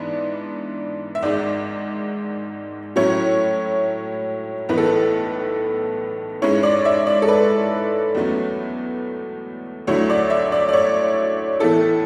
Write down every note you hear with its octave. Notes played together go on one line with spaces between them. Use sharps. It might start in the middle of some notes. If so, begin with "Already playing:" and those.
Already playing: G#2 E3 B3 D4
E5
G#1 G#2 G#3 D5
A2 F#3 C#4 E4 C#5
B1 A2 E3 B3 B4
A4
B4
G#2 G#3 C#4 E4 C#5
D5
E5
D5
A4
B4
E2 B2 F#3 A3 C#4
D2 D3 F#3 A3 E4 C#5
D5
E5
D5
D5
C#5
A2 E3 B3 E4 A4